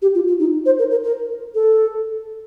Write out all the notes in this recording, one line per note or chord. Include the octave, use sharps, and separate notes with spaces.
G4
F4
F4
D#4
C5
A#4
A#4
A#4
A4